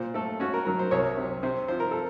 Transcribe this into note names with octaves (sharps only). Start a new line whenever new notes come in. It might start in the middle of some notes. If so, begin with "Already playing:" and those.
Already playing: A#2 C5
A3 A4
C#4 F#4
A#4
F#3 A#4
C5
C2 C#5
C3
C3 C5
F3 C5
A#4
A4